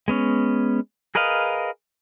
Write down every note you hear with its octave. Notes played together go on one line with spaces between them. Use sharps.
G#3 B3 C#4
G#4 A#4 B4 D#5 F5